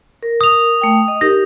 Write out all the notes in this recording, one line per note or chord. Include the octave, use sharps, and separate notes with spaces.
A#4
D#6 F7
A3 G5
D#5
D#4 G4 A#4 A#6